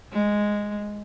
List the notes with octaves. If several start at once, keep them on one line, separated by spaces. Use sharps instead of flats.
G#3